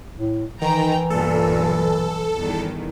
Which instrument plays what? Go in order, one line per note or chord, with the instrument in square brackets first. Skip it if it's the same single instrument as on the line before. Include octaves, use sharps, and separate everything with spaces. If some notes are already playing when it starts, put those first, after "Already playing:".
[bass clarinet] A2
[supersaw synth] D#3 [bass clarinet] E3 [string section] G5 A#5
[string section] B1 G2 A#2 [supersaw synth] A4
[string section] E2 G2 D#3